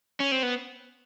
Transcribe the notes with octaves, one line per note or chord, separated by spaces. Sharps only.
C#4
C4
B3